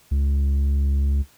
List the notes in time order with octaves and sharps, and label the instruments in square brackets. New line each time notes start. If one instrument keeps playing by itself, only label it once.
[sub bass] C#2